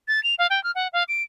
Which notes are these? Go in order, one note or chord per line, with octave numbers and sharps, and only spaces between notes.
A6
F7
F5
G5
F6
F#5
F5
D7